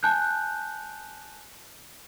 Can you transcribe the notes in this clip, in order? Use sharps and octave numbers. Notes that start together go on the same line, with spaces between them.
G#5 A5 F#6 G6